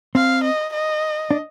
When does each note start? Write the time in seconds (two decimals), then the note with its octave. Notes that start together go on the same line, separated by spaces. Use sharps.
0.15 C4 F5
0.44 D#5
0.73 D#5
1.31 D4